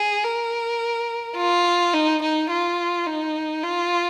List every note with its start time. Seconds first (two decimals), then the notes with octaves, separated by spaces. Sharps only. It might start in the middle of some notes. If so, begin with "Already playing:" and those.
Already playing: G#4
0.24 A#4
1.37 F4
1.93 D#4
2.22 D#4
2.50 F4
3.07 D#4
3.63 F4